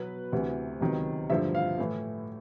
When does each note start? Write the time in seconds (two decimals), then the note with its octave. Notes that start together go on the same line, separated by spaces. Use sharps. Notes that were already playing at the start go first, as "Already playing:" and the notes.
Already playing: B2 F#3 B3 B4
0.32 D2 C3 E3
0.81 C#2 C3 D#3 F#3 B3
1.30 G2 D3 F3 A3 E5
1.55 F5
1.78 A2 E3 A3